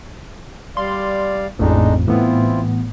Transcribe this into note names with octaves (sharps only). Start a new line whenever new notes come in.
G3 D5 F5 C6
A1 F2 A2 G#3 D4 D#4
A2 E3 B3 C4 E4 F4